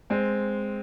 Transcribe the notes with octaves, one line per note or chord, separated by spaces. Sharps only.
G#3 C4